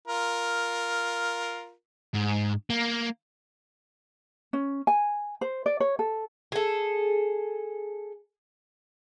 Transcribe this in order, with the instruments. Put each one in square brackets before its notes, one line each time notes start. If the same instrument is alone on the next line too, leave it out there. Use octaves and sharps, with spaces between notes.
[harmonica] F4 A#4
[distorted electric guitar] G#2
A#3
[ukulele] C#4
G#5
C5
D5
C#5
A4
[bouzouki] G#4 A4